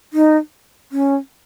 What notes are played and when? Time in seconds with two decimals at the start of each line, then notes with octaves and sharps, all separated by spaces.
0.13 D#4
0.92 C#4